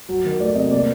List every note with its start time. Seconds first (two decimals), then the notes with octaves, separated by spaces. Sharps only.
0.09 F#3
0.25 D#3
0.39 A3 D5
0.55 C3 D#5
0.71 A#3 D5